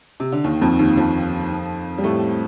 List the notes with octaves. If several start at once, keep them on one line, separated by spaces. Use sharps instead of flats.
C3
D3
D#2 D#3
F2 F3
D#2 D#3
F2 F3
G3
A2 A3